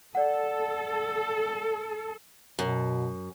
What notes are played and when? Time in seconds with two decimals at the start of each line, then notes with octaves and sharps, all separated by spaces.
0.15 A4 D5 F#5
2.59 F#2 B2